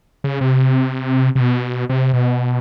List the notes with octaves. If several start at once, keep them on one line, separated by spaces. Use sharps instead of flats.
C#3
C3
C3
B2
C3
B2